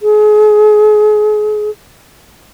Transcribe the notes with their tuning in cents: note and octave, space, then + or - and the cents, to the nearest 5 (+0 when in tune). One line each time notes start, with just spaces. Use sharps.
G#4 +35